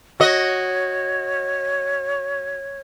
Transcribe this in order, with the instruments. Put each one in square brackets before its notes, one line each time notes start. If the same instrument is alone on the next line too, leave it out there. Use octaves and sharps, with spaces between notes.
[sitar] F#4 D#5 [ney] C#5